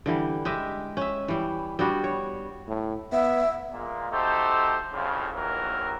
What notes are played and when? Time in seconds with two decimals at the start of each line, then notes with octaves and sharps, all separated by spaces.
0.06 D3 E3 G3
0.45 G#3 G4 D#5 E5
0.97 C#4 E5
1.28 E3 G3
1.79 G3 B3 D4 F#4
2.04 C#5
2.67 A2
3.12 B3 E5
3.72 A#2 G#3 A#3
4.11 A3 D#4 F#4 G4 A4 C5
4.92 C2 F2 A2 C#3
5.34 A#1 D#2 D#3 E3 F#3 A#4